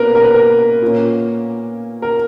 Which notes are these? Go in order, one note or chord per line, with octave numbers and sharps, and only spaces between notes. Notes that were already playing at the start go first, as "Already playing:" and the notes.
Already playing: B2 A#3 C#4 A#4 B4
A#4
B4
A#4
A#2 A#3 C#4
A#4